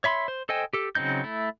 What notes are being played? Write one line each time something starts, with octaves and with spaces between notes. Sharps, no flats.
C#5 E5 B5 C6
C5
A4 C5 D#5 G5 G#5
G4 A4
C#3 F#3 C4 D#4 G6
A3 E4